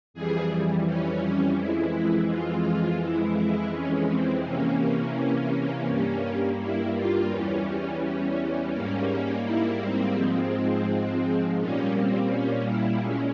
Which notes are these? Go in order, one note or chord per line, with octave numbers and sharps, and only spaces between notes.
F2 E3 G3 G#4
C#4
F2 E3 G#3 E4
F4
F2 E3 G#3 E4
E4
C#4
C4
C3 E3 A#3 C#4
G2 G3 A#3
E4
F4
E2 E3 G3 C#4
C#4
G#2 G3 A#3
E4
C4
G#2 F3 G#3
A#2 G3 A#3 C#4
C4
C#4
E4
A#2 G#3 C#4